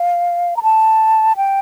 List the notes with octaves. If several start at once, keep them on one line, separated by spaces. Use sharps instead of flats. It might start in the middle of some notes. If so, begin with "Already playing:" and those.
Already playing: F5
A#5
A5
G5